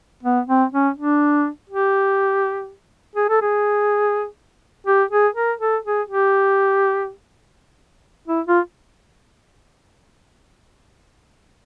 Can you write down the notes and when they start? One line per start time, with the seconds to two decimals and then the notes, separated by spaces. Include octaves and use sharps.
0.23 B3
0.47 C4
0.72 C#4
0.97 D4
1.69 G4
3.16 G#4
3.29 A4
3.42 G#4
4.87 G4
5.11 G#4
5.35 A#4
5.60 A4
5.85 G#4
6.08 G4
8.28 E4
8.47 F4